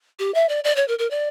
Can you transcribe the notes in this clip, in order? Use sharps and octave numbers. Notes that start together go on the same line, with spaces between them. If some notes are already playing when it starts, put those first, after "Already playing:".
G4
E5
D5
D5
C#5
A#4
A#4
D5